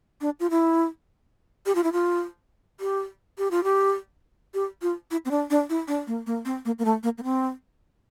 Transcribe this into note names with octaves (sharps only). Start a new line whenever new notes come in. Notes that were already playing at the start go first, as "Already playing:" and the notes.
D4
F4
E4
G4
F4
E4
F4
G4
G4
F4
G4
G4
F4
E4
C4
D4
D4
E4
D4
A#3
A#3
C4
A#3
A#3
A3
A#3
A#3
C4